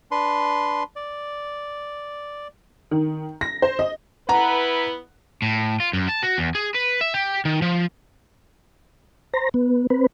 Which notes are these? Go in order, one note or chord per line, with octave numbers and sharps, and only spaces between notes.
D4 B4 C6
D5
D#3
A#6
C5
D#5
B3 E4 B4 F#5 A#5
A2
F4
F#2
A5
F#4
E2
G#4
B4
E5
G4
D#3
F3
C5 A#5
B3
C4 B4